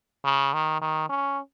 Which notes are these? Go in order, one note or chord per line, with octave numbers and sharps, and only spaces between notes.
C#3
D#3
D#3
C#4